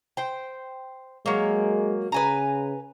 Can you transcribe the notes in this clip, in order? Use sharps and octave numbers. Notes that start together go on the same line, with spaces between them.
C5 G5
F#3 G#3 A#3
C#3 B4 G#5 A#5